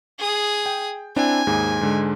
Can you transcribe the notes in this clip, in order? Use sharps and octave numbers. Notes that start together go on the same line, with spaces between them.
G#4 D#6
G5
C4 D4 E4 G#5
D#2 G#2 G#4
G#2 D3 G#3